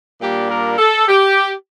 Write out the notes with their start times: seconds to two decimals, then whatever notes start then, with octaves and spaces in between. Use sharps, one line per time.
0.21 A#2 G3 A#3 D4 G4
0.50 A#4
0.78 A4
1.08 G4